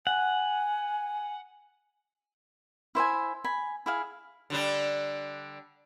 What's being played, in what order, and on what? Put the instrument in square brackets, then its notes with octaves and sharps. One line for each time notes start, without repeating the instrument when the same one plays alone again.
[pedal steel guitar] F#5 [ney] G#5
[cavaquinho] E4 C5 E5 G#5
G#5 B5
E4 G#4 F5
[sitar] D3 G3 D4